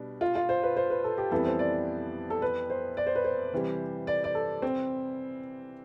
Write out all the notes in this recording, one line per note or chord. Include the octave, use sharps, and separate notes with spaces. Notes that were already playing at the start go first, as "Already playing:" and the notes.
Already playing: B2 G3 D4
F4
F4
C5
B4
C5
B4
A4
G4
F2 E3 G3 B3 E4 A4
C5
D5
A4
B4
C5
D5
C5
B4
C5
C3 E3 G3
D5
D5
A4
C4